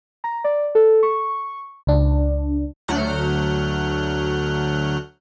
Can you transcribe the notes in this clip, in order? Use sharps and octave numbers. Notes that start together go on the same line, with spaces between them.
A#5
D5
A4
C#6
C#2 D4
D2 F#3 A3 F#5 F6 G6